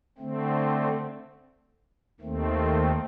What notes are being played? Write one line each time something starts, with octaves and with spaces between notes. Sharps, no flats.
D3 A3 C4
D#2 D#3 A3 C4